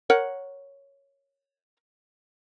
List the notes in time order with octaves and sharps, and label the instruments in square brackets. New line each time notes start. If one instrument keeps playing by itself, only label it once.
[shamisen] A#4 C#5 F#5